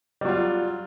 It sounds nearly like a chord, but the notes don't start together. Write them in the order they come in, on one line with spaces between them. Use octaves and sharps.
G3 F#3 F4